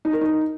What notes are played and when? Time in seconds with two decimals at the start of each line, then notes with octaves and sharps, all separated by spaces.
0.05 D#4
0.13 A#4
0.21 D#4